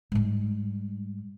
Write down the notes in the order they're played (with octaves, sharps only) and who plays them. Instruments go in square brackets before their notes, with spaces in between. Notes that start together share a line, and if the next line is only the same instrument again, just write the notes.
[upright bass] G#2 G3